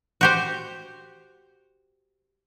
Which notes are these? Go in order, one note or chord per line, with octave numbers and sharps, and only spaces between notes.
F#4 G4 C5